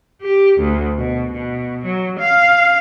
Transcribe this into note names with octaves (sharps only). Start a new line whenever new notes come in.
G4
D2
B2
B2
F#3
F5